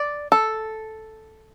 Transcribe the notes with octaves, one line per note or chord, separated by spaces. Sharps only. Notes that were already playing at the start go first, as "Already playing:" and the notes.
Already playing: D5
A4